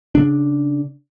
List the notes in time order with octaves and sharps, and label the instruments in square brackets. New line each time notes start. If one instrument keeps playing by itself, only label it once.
[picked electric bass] C#3 D4